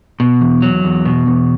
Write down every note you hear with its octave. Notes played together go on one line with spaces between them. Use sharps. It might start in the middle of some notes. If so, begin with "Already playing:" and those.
B2
E2
F#3
E2
B2
E2